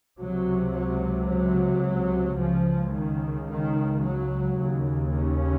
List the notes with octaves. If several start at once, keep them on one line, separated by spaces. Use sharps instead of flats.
C#2 C3 F#3
F#3
F#3
C#2 C#3 F3
D#3
D#3
F#3
D#2 C#3
C#4